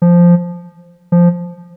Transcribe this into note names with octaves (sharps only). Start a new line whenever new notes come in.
F3
F3